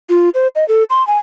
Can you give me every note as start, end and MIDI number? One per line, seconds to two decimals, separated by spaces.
0.10 0.29 65
0.35 0.48 72
0.56 0.66 75
0.68 0.83 69
0.90 1.05 84
1.07 1.18 80